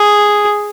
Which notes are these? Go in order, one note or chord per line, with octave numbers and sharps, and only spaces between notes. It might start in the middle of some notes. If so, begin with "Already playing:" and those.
Already playing: G#4